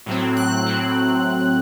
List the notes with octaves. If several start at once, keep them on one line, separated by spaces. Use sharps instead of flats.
A2 F#3 C4
F#6
A2 F#3 C4